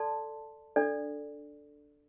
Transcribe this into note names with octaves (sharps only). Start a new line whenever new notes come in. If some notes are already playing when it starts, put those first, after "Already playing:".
Already playing: A4 D5 A5 C6
D4 A4 D5